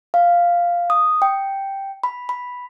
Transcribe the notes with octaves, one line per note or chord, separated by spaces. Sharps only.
F5
D#6
G5
B5
B5